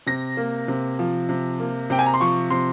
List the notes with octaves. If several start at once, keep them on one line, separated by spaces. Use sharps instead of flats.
C3 A#6
A#3
C3
F3
C3
A#3
C3 G5
G#5
A#5
C6
F3 C#6
C3 C6